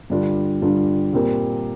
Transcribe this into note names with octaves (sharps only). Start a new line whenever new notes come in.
G2 D3 G3 D4 F4
G2 D3 G3 D4 F4
A#2 G3 C4 G4 A#4